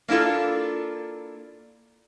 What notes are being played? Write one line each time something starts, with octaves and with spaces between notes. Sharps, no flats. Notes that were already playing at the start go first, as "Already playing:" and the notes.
A#3 D4 E4 F4 A4